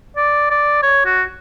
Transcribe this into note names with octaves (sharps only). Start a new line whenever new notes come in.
D5
D5
C#5
F#4